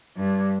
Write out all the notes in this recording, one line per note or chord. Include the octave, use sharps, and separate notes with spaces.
G2